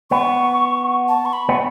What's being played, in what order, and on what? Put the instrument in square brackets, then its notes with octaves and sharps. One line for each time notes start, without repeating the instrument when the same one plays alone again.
[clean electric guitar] B3 [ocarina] C#6
[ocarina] A5
C#6
B5
[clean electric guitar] B3